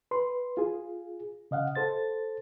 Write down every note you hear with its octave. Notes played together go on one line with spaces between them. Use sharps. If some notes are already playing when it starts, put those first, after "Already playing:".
B4 C6
F4 G#4
C#3 D#5 F5 F#5
A4 C5 A6